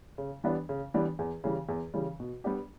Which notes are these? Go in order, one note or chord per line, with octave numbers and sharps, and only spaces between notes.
C#3
E3 G3 B3 D4
C#3
E3 G3 B3 D4
E2
C#3 E3 G3
E2
C#3 E3 G3
B2
G3 B3 D4 G4